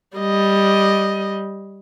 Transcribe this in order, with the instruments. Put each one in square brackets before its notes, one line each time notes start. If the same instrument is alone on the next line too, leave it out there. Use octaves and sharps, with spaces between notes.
[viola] G3 D#5